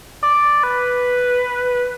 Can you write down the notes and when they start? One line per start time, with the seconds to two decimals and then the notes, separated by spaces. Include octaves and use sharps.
0.23 D5
0.63 B4